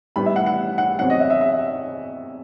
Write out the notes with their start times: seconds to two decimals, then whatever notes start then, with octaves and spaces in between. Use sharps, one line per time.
0.16 A2 G3 B3 B5
0.26 E5
0.36 F#5
0.46 F#5
0.78 F#5
0.99 E2 C3 F#3 C4 F#5
1.10 D#5
1.20 E5
1.30 E5
1.41 E5